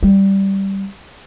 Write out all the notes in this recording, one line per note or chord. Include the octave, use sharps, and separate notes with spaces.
G3